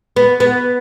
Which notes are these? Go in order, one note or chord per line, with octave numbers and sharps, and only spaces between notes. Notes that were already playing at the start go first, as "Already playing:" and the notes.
B3
B3